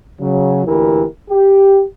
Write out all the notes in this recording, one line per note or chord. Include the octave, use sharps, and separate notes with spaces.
C#3 F#3
D2 A#2 E3 E4 G4 A#4
G4